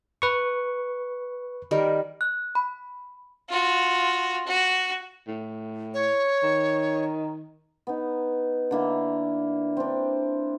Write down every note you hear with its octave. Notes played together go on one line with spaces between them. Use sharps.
B4 C#6
D#3 G3 A#4
F#6
B5
F4 F#4
F#4
A2
C#5
D#3
B3 D#4
D3 A#3 E4
C4 D4